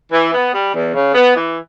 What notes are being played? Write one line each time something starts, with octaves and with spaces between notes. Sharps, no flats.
E3
B3
G3
E2
C#3
B3
E3